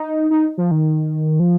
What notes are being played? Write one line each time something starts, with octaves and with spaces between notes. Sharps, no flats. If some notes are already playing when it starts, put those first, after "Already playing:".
Already playing: D#4
D#4
F3
D#3
F3